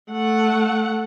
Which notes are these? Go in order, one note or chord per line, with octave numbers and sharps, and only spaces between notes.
A3 F#5